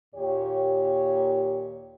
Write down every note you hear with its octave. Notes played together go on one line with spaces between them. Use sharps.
D#2 A#2 G4 C#5